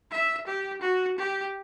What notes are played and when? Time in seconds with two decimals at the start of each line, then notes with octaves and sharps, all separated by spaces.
0.11 E5
0.47 G4
0.81 F#4
1.18 G4